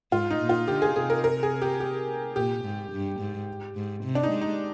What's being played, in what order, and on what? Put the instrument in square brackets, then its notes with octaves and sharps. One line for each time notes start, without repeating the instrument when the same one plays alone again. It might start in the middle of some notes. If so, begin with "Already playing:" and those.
[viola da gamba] G#2 [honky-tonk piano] F4
[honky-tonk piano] D#4
[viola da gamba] A#2
[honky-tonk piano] F4
[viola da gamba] D3 [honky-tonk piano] G4
[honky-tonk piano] G#4
[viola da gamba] C3 [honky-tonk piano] G#4
[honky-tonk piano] A#4
A#4
G#4
G4
G4
[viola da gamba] A#2 [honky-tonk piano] G4
[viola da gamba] G#2
G2
G#2
G#2
C3
[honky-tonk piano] D4
D#4
[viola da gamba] G#3
[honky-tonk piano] D#4